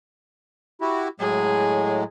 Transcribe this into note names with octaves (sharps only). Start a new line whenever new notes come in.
E4 F#4 G4
A2 F#3 G#3 G#4